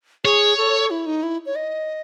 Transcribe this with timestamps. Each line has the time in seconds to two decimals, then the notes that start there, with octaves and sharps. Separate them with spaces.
0.24 G#4 C#5
0.58 A4
0.91 E4
1.06 D#4
1.23 E4
1.46 C#5
1.55 D#5